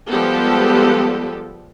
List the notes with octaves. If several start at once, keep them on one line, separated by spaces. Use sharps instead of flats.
F3 G3 G#3 B3 G4 A4